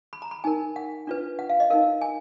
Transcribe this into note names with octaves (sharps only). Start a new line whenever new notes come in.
B5
A#5
B5
D#4 A#4 G#5
F#5
D4 F4 B4
F#5
F5
D#5
D#4 A#4 F5
G#5